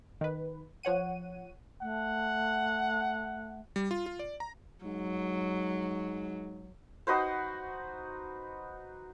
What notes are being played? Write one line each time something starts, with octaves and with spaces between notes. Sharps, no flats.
D#3 B4
F3 C#5 F#5 D#7
A3 F#5
G3
F4
F4
D5
A#5
G#2 F#3
D#4 F#4 B4 C5